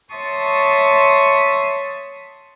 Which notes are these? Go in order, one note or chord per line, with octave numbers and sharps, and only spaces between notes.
C#5 E5 A5 C6 C#6 D#6